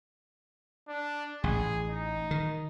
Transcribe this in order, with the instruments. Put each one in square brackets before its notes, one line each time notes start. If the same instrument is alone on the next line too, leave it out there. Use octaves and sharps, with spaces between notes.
[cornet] D4
[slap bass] A1 [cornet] G#4
[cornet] D#4
[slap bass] D#3